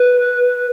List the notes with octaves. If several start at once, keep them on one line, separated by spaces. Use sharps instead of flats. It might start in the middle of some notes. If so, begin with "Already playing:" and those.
Already playing: B4